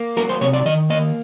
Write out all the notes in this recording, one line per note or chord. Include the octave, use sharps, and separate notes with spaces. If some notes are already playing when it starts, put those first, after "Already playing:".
Already playing: A#3
F#3 A#4
C5
C3 C#5
D5
D#3 D#5
A#3 D#5